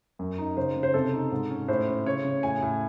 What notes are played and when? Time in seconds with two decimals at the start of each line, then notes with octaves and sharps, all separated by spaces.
0.19 F#2
0.38 D#4
0.57 C#3 C5
0.76 C#3
0.83 C5
0.94 C3 A4
1.14 D#4
1.31 G#2
1.50 C#4
1.68 A2 C5
1.88 C#4
2.06 C#3 C#5
2.24 C#3
2.43 A2 G#5
2.62 A2